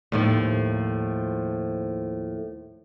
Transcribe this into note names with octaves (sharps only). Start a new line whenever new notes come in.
D#2 A2 F3